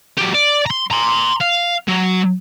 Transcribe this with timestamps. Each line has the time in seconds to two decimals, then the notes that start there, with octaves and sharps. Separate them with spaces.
0.18 F#3 G4
0.35 D5
0.67 A#5 C6
0.92 A#5 C6
1.41 F5
1.88 F#3